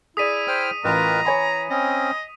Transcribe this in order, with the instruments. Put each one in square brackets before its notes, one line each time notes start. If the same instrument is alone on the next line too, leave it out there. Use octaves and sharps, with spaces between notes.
[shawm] E4 [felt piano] G#4 D5 [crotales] D#6 B6 D#7
[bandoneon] C5 G5 F6
[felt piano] A1 [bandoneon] F4 A#4 B4 [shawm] A#5
[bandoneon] E3 [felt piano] C#5 G#5 B5
[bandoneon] C4 C#4 [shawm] D#5